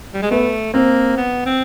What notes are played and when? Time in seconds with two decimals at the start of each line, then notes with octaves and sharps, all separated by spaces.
0.13 G3
0.22 G#3
0.30 A3 B3
0.73 A#3 C4
1.17 B3
1.46 C4